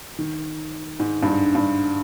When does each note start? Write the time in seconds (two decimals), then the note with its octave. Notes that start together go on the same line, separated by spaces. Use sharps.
0.19 D#3
1.00 G#2
1.22 G2
1.28 G#2
1.55 G2